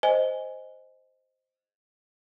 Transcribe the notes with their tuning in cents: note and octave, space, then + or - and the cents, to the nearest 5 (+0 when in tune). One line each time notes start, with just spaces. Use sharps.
C5 +0 D#5 +0 G#5 +0